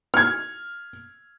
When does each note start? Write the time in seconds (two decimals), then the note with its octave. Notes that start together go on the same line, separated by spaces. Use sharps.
0.14 F6 G#6